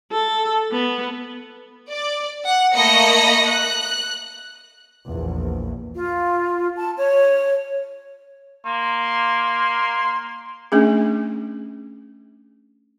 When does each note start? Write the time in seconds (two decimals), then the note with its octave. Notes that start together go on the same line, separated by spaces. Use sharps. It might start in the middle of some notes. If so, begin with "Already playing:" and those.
0.12 A4
0.71 B3
1.90 D5
2.45 F#5
2.75 A3 A#3 D#5 B5 A#6 C#7
3.47 F#6
5.08 A#1 E2
5.95 F4
6.77 A5
6.96 C#5
8.66 A#3 C6
10.72 A3 C#4 D4 G#4